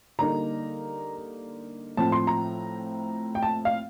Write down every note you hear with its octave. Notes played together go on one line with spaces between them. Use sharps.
D3 G3 A#3 D#4 A#5
A2 F3 C4 A5
C6
A#5
G5
A5
F5